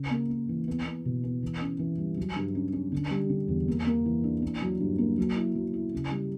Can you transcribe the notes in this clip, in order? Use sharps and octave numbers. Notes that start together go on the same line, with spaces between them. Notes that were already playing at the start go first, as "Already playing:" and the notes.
Already playing: C#3
A#3
A#3
E3
B3
B3
B2
B3
E3
C#4
E3
G3
F#3
G2
C#4
C#4
D3
G3
D3
E2
A#3
A#3
E3
D4
A#3
F#3
G2
A#3
F#3
E4
F#3
E4
C#3
G3